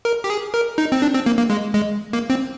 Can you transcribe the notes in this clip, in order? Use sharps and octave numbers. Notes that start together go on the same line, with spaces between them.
A#4
G4
G#4
A#4
D#4
C4
D4
C4
A#3
A#3
G#3
G#3
A#3
C4